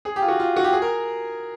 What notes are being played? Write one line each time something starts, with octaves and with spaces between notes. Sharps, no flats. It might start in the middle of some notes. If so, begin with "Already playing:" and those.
G#4
G4
F4
F#4
F4
F#4
G4
G#4
A#4